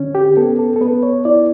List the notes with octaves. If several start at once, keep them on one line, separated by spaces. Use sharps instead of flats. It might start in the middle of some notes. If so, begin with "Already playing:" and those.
Already playing: D3 C#4
G4
B3 A4
A4
A4
B3 B4
C#5
E4 D5